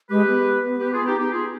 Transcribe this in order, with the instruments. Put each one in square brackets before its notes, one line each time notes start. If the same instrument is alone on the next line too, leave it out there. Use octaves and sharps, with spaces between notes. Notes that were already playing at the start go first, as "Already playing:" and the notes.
[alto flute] G#3 [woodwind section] G4 B4
[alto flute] B3
[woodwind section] G4 B4
F4 G#4
D#4 G4
D#4 G4
F4 G#4